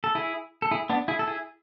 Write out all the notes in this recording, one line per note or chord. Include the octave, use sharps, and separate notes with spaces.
A4
E4 G#4
A4
E4 G#4
B3 D4
E4 G#4
A4
E4 G#4